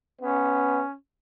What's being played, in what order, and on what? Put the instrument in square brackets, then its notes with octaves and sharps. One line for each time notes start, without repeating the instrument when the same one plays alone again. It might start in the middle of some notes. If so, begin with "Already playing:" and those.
[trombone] B3 [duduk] C#4